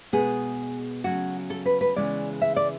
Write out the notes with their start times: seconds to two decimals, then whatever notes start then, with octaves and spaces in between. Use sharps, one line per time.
0.13 B2 G#3 B3 G#4
1.04 C#3 F#3 A3 F#4
1.50 A4
1.66 B4
1.81 B4
1.96 C#3 E3 G#3 B3 D5
2.42 E5
2.56 D5